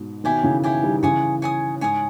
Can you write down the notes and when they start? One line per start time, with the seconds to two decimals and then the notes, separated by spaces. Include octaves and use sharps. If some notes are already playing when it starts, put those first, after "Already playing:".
Already playing: G#2 B2
0.24 B2 D#3 E4 G4 C#5 G#5
0.44 C#3 E3
0.64 E4 G4 C#5 G#5
0.83 D#3 G3
1.03 C#3 E3 C#5 G#5 D#6
1.42 C#5 G#5 D#6
1.81 G#2 C#5 G#5 D#6